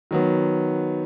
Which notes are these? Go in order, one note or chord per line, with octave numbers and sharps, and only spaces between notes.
D#3 F#3 B3